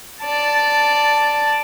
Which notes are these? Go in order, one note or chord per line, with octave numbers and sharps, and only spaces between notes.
D5 A5